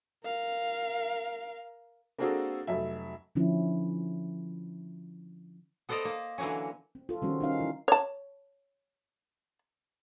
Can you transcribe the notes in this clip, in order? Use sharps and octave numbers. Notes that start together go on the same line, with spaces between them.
A#4 F5
A#3 C4 D4 F#4 G#4 A4
F1 F#3 E5
D3 F3 C#4 E4
B3 A4 C5 D5 D#5 F5
A#3
D3 E3 F#3 A#3 C#4
C4
F4 A4
D#3 G3 C4 C#4 F#4
C#4 D#4 F5
E3 E4
C#5 A5